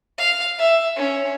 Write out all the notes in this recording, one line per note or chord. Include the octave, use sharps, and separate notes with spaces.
F5
E5
C#4